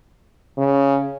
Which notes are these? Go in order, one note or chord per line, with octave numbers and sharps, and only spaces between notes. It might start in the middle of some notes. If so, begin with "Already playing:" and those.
C#3